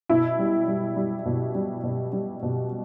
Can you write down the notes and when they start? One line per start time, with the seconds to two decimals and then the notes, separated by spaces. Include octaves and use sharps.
0.09 B2 E4
0.39 G3
0.68 G3
0.96 G3
1.25 B2
1.55 G3
1.83 B2
2.13 G3
2.42 B2